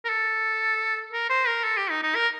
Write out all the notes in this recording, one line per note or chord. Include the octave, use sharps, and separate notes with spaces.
A#4
A4
A#4
C5
A#4
A4
G4
D#4
D#4
A#4